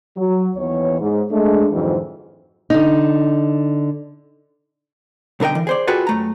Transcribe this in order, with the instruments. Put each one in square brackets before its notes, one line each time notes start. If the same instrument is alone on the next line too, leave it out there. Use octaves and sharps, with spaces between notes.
[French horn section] F#3
D#2 E3 B3 C#5
G#2
G#3 A3 D4
F2 G#2 D3 E3 F#3 C5
[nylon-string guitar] D3 D#4
[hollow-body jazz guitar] B1 D3 A#4 D#5 G5
E3
G#4 C5 D5
F4 F#4 G#4 A4 B4 G5
F#2 A3 A#5